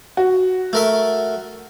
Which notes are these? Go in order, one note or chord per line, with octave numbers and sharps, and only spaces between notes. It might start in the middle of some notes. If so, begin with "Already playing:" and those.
F#4
A3 A#4 E5